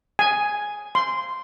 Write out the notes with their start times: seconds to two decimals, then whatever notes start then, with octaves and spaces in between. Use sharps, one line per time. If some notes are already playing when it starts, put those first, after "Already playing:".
0.19 G#5
0.95 C6